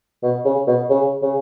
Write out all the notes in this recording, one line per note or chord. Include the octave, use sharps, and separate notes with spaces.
B2
C#3
B2
C#3
C#3